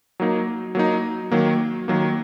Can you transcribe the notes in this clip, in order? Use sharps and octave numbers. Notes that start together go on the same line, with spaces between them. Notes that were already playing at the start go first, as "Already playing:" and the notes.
F#3 A#3 D#4
F#3 A#3 D#4
D#3 F#3 A#3
D#3 F#3 A#3